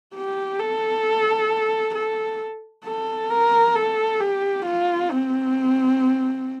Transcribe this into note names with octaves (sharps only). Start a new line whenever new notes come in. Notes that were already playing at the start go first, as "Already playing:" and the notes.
G4
A4
A4
A4
A#4
A4
G4
F4
C4